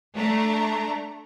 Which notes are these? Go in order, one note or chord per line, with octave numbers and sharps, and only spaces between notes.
A3 D4 A#5